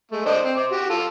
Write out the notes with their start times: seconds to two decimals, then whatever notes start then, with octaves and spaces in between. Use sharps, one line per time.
0.11 G#3 A3
0.26 D4 C5 D#5
0.44 C4
0.57 C5 D6
0.71 F#4 G4
0.89 F4 A4